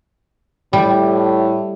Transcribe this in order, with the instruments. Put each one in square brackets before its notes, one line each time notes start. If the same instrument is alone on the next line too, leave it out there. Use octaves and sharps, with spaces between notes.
[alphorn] A2 [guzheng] G3